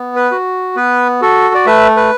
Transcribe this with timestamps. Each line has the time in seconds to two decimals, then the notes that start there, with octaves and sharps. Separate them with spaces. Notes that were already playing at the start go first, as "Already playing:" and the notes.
Already playing: B3
0.16 B4
0.31 F#4
0.76 B3 B4
1.21 F#4 A4
1.55 D5
1.66 A3 B4 E5
1.96 B4